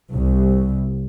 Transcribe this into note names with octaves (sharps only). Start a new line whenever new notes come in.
C2